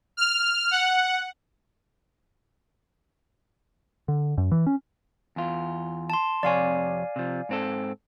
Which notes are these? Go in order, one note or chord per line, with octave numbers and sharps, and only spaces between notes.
F6
F#5
D3
F#2
E3
C#4
E2 F4
A5 C6
F2 C3 C#5 D5 F5 G#5
C3 F3
G#2 C4 A4